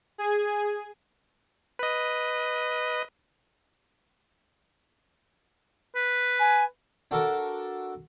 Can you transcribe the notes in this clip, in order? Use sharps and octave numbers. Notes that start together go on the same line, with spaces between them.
G#4 G#5
B4 D#5
B4
G#5
D4 F#4 A4 A#4